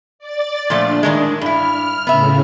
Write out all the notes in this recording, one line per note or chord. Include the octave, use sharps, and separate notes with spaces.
D5 A6
A#2 F3 A3 D4
A2 D#3 G#3
G2 E4 F6
A2 C#3 B3 E5